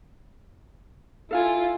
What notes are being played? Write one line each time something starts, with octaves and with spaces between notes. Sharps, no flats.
E4 F4 A4 F5 G#5